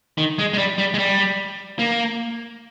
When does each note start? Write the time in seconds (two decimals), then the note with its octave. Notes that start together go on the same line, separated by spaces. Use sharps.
0.18 D#3
0.39 G#3
0.53 G#3
0.58 G3
0.78 G3
0.94 G#3
0.98 G3
1.79 A#3